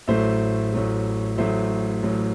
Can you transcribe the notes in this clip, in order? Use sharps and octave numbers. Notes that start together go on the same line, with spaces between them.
A1 A2 F#3 A3 C5 E5
A1 A2 F#3 A3
A1 A2 F#3 A3 C5 E5
A1 A2 F#3 A3